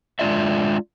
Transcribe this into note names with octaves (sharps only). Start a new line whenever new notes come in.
G#3 C4 D4 F4 D5 E5